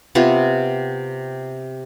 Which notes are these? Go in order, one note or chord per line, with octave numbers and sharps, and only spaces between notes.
C3 B3 C4 F4